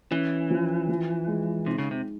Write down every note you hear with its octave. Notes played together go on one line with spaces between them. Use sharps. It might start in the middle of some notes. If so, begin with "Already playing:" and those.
E3 C#4
F3
F3
G#3
C3 D#4
C#3
C3